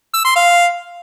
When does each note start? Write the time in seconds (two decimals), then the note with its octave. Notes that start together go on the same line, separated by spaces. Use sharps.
0.14 E6
0.24 C6
0.35 F5